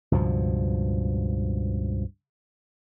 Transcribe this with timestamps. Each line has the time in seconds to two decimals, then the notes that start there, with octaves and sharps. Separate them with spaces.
0.11 C#2 G2 B2 F3